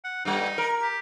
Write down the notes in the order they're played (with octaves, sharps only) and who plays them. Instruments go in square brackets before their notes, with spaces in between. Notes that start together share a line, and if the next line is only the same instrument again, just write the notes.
[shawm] F#5
[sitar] G2 G3 [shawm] D#4
[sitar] A#4
[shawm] G4